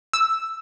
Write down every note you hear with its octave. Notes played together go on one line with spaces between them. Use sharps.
E6